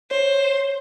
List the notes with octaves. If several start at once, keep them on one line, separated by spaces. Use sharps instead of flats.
C5 C#5